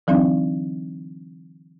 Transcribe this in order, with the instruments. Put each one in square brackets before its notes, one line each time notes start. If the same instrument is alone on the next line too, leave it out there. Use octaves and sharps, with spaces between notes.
[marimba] D3 E3 F#3 C4 D4 D#4